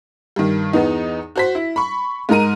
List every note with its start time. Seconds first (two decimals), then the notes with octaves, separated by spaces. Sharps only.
0.36 G2 D#3
0.73 E2 B3 D#4
1.36 F#4 C5 B6
1.55 E4
1.76 B5 C#6
2.29 G#2 D#4 A#4 A#5 D#7